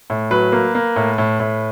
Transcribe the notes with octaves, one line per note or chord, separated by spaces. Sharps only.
A2
F#3 B4
A#3
A#3
A2
A2
A2